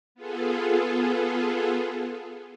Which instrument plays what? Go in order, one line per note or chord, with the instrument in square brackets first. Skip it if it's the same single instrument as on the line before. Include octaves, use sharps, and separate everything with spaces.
[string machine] B3 F4 G#4 A4